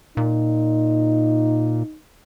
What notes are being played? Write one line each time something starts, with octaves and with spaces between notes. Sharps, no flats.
A#2 D#4